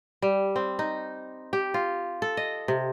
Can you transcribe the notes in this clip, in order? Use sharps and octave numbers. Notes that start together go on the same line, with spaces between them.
G3
C4
D#4
G4
F4
A4
D#5
C3